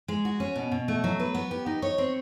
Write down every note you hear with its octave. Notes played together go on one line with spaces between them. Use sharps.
G#3
F#4
C#4
B2
B2
A3
F#3
B4
B3
G4
D#4
C#5
C4